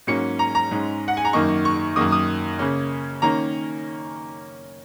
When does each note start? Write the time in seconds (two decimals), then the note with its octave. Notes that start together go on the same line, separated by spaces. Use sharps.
0.07 G#2 F#3 A#3 C#4 C#7
0.39 A#5
0.55 A#5
0.71 G#2 G#3 C#4
1.08 F#5
1.17 G#5
1.25 A#5
1.33 F#2 D#3 A#3 D#4 C#6
1.65 C#6
1.96 F#2 D#3 A#3 D#6
2.12 D#6
2.59 C#3 A#3 C#4
3.22 D#3 A#3 C#4 A#5